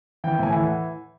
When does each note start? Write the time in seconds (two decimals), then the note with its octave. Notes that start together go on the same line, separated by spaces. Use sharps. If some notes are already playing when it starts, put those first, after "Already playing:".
0.24 E3 G5
0.39 A2 G#5
0.53 E3
0.63 F#5